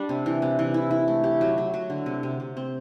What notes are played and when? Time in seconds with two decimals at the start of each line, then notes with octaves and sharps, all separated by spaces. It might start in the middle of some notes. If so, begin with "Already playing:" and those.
Already playing: G3 D4
0.09 C3
0.26 E3
0.42 C3
0.59 E3
0.74 E4
0.91 E4
1.08 A3
1.24 G4
1.41 F#3
1.58 F#3
1.74 F#3
1.90 D3
2.06 C3
2.23 C3
2.40 C3
2.57 C4